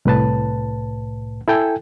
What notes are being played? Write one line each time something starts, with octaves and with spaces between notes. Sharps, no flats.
C2 A2 B4 A5
E4 A4 G5 G#5